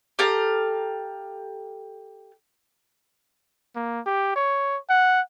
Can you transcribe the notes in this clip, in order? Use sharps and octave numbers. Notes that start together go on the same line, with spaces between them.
G4 A4 F5 A#5
A#3
G4
C#5
F#5